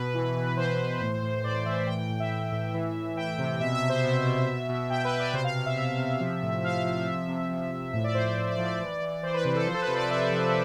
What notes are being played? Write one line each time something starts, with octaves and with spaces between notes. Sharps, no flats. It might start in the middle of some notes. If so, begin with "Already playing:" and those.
Already playing: B2 B4
E3
E3
E3 C5
E3
A2
A2
A2 D5
E3 E5
E3 G5
G5
A2
E5
A2
A2
E3
E3
E3 G5
C3
B2 E5
E5
B2
C5
B2 E5
B2
B2
B2
B2 G5
B4
B2
D5
C3 C5
F5
C3 F5
E5
C3 E5
C3
F3
A2
F3 F5
F3
C3 E5
C3
F3
F3
A2 E5
D5
A2 C5
D5
A2 C5
D5
F3
D5
E3
E3
E3 C5
B4
C3 B4
A4
F3 C5
A4
B4
C3
D5
C3 E5
F3